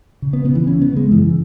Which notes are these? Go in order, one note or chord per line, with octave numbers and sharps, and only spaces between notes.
C#3
B3
C#3 B3
E3
C#3 C#4
B3
C#3
G#3
F#2 E3